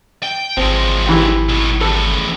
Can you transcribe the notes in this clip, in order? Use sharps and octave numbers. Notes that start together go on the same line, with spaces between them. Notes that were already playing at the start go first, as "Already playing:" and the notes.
G5
G#1 F3 G#3 C4
E3 G4
B1 A2
E2 A2 A4